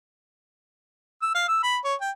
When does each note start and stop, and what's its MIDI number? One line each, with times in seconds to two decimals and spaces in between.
1.22 1.32 88
1.35 1.47 77
1.48 1.63 88
1.63 1.77 83
1.84 1.94 73
2.01 2.10 79